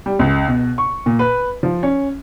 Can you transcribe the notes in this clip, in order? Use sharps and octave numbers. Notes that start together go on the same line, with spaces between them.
G3
C#2
B2
C#6
A#2
B4
F3
C#4